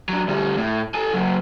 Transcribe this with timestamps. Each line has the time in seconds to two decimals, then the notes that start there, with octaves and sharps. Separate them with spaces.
0.09 F#3 D4
0.28 D2 G3
0.57 A2
0.95 A4 G#5
1.13 C#3 F#3